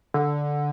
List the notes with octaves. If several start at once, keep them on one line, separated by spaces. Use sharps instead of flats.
D3